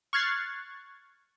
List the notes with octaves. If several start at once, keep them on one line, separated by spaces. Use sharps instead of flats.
C#6 F6 F#6 G#6 A6 C7